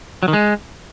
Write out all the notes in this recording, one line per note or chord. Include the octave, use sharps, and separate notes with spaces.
F#3
D#3
G#3